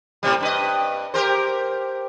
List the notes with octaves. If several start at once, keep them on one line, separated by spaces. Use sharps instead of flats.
A2 C3 G3
G2 B4 D#5
G4 A#4 C5